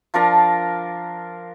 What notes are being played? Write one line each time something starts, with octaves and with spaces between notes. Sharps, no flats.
F3 D4 A#4 F5